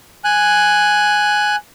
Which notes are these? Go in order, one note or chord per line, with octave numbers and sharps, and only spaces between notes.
G#5 F#6